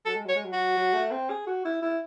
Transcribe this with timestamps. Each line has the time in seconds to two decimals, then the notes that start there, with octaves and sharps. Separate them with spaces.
0.05 F#3 A4
0.15 G#3
0.25 F#3 C#5
0.35 G#3
0.45 F#3
0.53 F#4
0.77 F#3
0.93 A3
1.11 C4
1.30 G#4
1.47 F#4
1.65 E4
1.82 E4